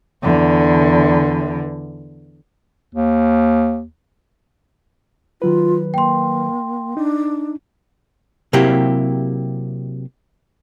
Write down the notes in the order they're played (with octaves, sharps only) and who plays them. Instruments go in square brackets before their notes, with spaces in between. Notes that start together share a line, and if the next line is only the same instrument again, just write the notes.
[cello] E2 D3
[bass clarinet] D#2
[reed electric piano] D#3 F#3 B4 [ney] F4
[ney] A#3 [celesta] G5 C6
[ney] D4 [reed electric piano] D#4
[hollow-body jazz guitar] C3 F#3 A#3 E4 G4